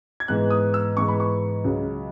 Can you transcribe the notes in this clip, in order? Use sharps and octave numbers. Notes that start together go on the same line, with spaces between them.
G#6
G#2 E3 B3 F#6
D#6
E6
G#2 E3 B3 C#6
B5
C#6
C#2 C#3 F#3